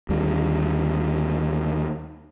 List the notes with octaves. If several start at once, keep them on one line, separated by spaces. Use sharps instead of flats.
D#2 D3 G3